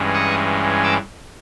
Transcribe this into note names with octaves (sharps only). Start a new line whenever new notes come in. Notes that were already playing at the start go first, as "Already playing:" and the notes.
Already playing: G2 E3 G#3 C#4
C#6 D#6
D6 E6